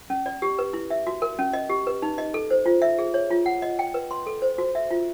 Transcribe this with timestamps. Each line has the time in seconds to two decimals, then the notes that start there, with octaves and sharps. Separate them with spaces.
0.10 C#4
0.26 D5
0.42 G4
0.59 B4
0.73 E4
0.90 E5
1.07 F#4
1.22 A#4
1.39 C#4
1.53 D#5
1.70 G4
1.87 B4
2.02 D#4
2.18 D#5
2.34 A4
2.51 C5
2.66 F4
2.82 E5
2.99 G#4
3.14 C#5
3.30 F4
3.46 F#5
3.62 D#5
3.79 G5
3.94 B4
4.11 C6
4.27 A4
4.42 C5
4.58 F#4
4.75 E5
4.91 F4